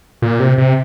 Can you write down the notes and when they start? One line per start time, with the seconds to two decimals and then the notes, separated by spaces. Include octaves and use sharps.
0.22 A#2
0.40 C3
0.58 C3